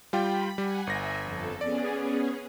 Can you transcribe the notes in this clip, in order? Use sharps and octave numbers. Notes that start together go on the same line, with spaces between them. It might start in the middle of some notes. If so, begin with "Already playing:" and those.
G3 F4 G5 B5
G3 F#5 G#5
G1 E5 G#5 A#6
F2 A4
B3 C#4 G#4 D5